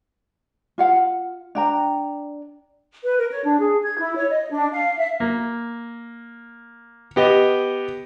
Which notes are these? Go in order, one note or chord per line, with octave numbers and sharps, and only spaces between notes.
F4 F5 F#5
D4 G5 A#5
B4
A#4
C#5
D4
G#4
G#6
E4
C#5
D#5
D4
F5
E5
A#3
B3 G4 D#5